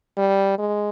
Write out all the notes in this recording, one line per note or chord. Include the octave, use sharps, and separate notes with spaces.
G3
G#3